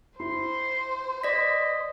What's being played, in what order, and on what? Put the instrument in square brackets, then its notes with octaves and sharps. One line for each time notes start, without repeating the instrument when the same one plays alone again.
[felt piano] E4 [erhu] C5 [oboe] C6
[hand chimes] D5 B6 [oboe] D#5